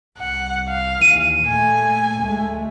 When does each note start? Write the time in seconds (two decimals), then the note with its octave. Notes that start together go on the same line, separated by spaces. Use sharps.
0.18 C2 F#5
0.68 F5
1.02 D#2 E3 D#7
1.47 A#2 A3 G#5
2.21 D2 G#3 A3